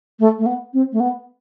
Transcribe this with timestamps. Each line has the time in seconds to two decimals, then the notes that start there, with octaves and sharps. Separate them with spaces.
0.19 A3
0.39 A3
0.46 B3
0.73 C4
0.92 A3
1.00 B3